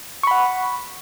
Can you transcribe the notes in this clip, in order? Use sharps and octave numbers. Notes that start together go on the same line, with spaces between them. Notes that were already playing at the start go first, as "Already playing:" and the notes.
F#5 B5 C#6